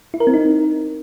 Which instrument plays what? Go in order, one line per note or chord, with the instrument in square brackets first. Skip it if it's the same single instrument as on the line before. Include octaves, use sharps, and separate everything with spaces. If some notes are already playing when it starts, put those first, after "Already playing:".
[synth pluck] E4
A#4
C4
D#4